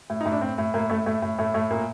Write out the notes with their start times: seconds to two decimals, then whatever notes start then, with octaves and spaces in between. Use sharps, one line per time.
0.10 A2
0.21 D#4
0.26 A2
0.32 D4
0.41 A2 C4
0.58 A2
0.74 A2 A#3
0.90 A2 A3
1.06 A2 A3
1.22 A2
1.39 A2 A3
1.54 A2 A3
1.71 A#2 A#3